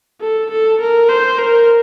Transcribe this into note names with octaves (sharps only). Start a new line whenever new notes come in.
A4
A4
A#4
C5
A#4